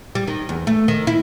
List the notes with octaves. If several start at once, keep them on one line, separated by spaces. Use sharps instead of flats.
G3
D#3
E2
A3
D#3
E4